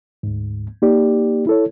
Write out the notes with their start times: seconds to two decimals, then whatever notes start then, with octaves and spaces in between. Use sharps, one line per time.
0.23 D2 G#2
0.82 A#3 D#4 G4 D5
1.47 E4 A4 C#5